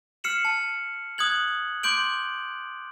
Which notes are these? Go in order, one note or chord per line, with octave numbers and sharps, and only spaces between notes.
F6 C7 C#7 E7 F#7
A5
D#6 F#6 G#6 F#7
C6 D6 G6 D7 F#7